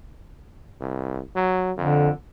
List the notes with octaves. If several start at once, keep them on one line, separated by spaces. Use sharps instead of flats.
C2
F#3
F2 D3